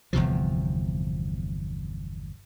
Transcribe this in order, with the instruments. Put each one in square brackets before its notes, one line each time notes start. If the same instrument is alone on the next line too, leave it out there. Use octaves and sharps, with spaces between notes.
[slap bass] G1 E2 C3 F3